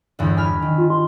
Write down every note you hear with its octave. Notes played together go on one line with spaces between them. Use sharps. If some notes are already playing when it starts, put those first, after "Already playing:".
G1 E2 D3
G#5 B5 F6
D#3
F4
C6